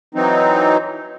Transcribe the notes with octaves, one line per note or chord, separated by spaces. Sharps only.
E3 F#3 C4 D#4